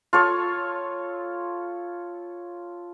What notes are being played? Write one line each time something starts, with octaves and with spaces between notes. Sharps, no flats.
F4 A4 C#5